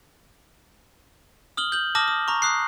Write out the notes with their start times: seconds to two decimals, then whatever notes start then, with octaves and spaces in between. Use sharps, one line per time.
1.57 D#6 F6 F#7 G7
1.72 G6 F#7
1.95 A5 D6 D#6 F6 A#6
2.08 D#6
2.28 A#5 C#6
2.42 D#6 F#6 C7